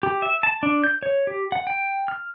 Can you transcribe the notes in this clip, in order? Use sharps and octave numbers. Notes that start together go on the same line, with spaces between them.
G4
E5
A5
D4
G6
C#5
G4
F#5
G5
F6